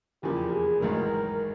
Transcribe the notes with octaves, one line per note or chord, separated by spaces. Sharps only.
F1 E2 C#3 F3 A#3 G4
G#4
A1 G#2 D#3 F#3 A#4